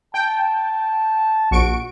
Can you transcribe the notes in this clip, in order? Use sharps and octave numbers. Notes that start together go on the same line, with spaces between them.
G5 A5
A#1 F#4 C#6 D7